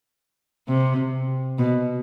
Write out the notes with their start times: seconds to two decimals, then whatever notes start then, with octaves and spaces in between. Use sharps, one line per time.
0.68 C3
1.58 B2